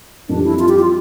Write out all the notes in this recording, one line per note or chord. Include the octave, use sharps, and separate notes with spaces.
F2 E3 G3 D4
E4
F4
G4
F4